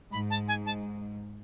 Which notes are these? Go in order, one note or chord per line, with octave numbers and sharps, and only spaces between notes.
G#2 B5
A5
G#5
A5